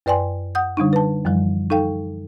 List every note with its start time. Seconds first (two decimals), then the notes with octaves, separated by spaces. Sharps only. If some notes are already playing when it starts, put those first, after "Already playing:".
0.06 F#2 B4 D5 G5 G#5 C6
0.55 F#5 D#6 G6
0.77 D3 G3 D4 D#4
0.93 B4 A5
1.25 F#2 E3 F3 G3
1.70 D#4 A4 F5 G5